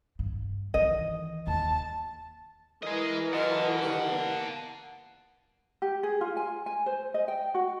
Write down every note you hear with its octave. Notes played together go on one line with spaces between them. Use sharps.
G2
D#3 E3 D#5
D#2 A5
E3 G#4 A#4 D#5
F#3 F4 D#5 F#5 A5
B2 D#3 G3
A#3 B3
G4
G#4
F4
G#5
G#5
C5
D#5
G5
F#4